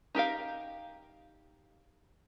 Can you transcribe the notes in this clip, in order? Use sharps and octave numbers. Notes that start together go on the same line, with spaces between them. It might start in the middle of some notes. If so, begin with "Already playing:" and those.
D#4 G4 A#4 F5